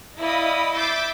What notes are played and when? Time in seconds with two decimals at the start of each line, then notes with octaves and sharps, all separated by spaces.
0.19 E4 D5 D#5 F5 B5 D#6
0.74 E5 D6 G6 A6 C7